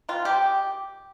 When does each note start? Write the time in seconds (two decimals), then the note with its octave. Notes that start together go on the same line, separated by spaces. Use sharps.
0.09 D#3 F4
0.25 G#3 G4
0.42 D#3